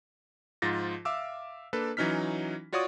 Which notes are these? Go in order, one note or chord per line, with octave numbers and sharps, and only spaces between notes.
G#2 F3 F4 A6 A#6
E5 F5 D6 E6
A#3 D4 A4 B4
E3 F#3 C#4 D#4 F6 B6
F4 F#4 C#5 D5 C#6 D#6